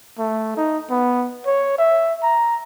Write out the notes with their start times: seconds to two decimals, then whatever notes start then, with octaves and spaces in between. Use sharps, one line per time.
0.18 A3
0.57 D#4
0.90 B3
1.46 C#5
1.78 E5
2.23 A#5